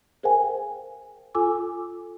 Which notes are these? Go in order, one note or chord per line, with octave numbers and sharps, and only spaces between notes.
G#4 A#4 C5 F5 G5 G#5
F4 A4 G#5 D6 E6